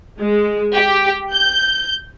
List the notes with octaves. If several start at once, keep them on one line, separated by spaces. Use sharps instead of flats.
G#3
G4
G6